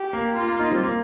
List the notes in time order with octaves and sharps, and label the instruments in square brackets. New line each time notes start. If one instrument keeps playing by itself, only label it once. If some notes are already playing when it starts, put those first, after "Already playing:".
Already playing: [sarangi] G4
[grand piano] A#3
[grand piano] A#3 [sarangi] F4
[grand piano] A#3
A#3 D#4
G3 C4
A#3